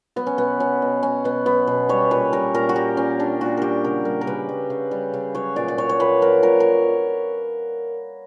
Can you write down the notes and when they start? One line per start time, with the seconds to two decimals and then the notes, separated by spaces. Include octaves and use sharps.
0.16 F#3 B3
0.27 C#4
0.38 B2 B3
0.60 F#3 C#4
0.82 B2
1.03 F#3 C#4
1.24 B2 B3
1.46 F#3 B3
1.67 B2
1.89 G3 C#5
2.11 A#2 B4
2.33 G3 A#4
2.54 A#2 A#4
2.69 F#4
2.75 G3 G4
2.97 A#2 C#4
3.19 G3 D4
3.41 A#2 F#4
3.57 G3 G4 A#4
3.84 C#3 A#4
4.05 G3 A#4
4.21 A#4
4.27 C#3 B4
4.49 G3
4.70 C#3
4.91 G3
5.14 C#3
5.35 F#3 C#5
5.56 A#2 D5
5.68 D5
5.78 F#3 C#5
5.89 C#5
6.00 A#2 B4
6.22 F#3 A#4
6.43 A#2 A#4
6.60 A#4